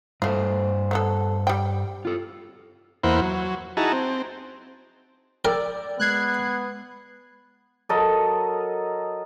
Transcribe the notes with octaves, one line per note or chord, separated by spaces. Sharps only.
G2 A3 F4 C5
A3 B3 A4
G3 G5
F4 A4
E2 A#3 E4 C5 F#5 B5
F#3
D#4 E4 F#4 G#4 A5 A#5
C4
A#4 D5 G5 D6 E6
G#3 B3 F#6 G#6 C7
F#3 A4 A#4 D#5